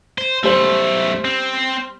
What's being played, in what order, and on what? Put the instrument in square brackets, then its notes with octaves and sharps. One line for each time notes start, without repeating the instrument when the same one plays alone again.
[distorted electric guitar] C5
[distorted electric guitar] B1 A3 [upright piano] G3 C5 F#7
[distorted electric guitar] C4